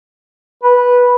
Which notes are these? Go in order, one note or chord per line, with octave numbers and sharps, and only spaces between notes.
B4